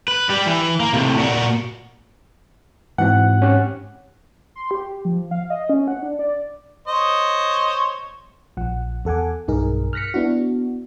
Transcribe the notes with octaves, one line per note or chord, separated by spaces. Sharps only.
B4
G3 G4
E3
A#3
A2 C3
A#2 F#4
G#2 E3 C4 F#4 F#5
C#4 G4 F#6
C6
G4
F3
F5
D#5
C#4
F#5
D4
D5
C5 C#5 D#5
A#1 F3 F#5
E2 A4 F#5 G#5 D6
B1 G2 D#4 G#4 A#4
F6 F#6 A#6 B6 C#7
B3 D4 E4 F#4